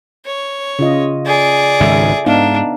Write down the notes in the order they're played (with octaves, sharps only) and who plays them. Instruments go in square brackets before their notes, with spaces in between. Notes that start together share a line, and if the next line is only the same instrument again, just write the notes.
[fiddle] C#5
[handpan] C#3 F4 D#5
[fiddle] G#4 D5
[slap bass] G#1 C#2 G#2 [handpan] A4 E5
[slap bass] G#2 [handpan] B3 D#4 F5 [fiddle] D4